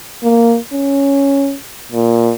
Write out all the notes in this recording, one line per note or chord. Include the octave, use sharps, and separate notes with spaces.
A#3
C#4
A#2